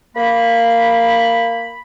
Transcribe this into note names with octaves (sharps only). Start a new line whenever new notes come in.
A#3 B5